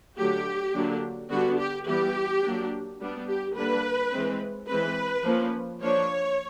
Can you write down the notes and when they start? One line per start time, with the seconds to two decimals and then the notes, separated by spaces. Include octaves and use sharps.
0.17 D3 F#3 A3 G4
0.74 D3 F#3 A#3 D4
1.30 D3 G3 B3 D4 F#4
1.58 G4
1.86 E3 G3 B3 G4
2.44 F#3 A#3 D4
3.00 G3 B3 D4
3.27 G4
3.56 D3 G3 A#3 D4 B4
4.12 E3 G#3 C4
4.68 E3 G#3 C4 B4
5.25 F3 A#3 C#4
5.81 F3 A#3 D4 C#5